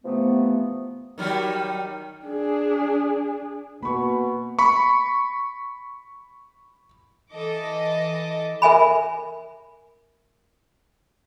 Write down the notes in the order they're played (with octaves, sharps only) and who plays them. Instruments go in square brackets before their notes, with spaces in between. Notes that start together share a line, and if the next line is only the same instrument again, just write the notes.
[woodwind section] C3 E3 F3 A3 B3
[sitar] D#3 F#3 G3
[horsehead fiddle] D4 G#4
[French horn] B2 [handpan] A#3 B4 [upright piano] B5 C#6
[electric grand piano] B5 C#6
[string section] E3 A4 D#5 D6
[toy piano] A#4 E5 G#5 B5